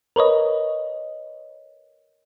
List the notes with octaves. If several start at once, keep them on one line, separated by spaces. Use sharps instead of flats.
A#4 B4 C#5 D#5